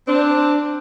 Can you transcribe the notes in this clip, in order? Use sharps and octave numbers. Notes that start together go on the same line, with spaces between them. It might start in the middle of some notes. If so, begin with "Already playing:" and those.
C4 D4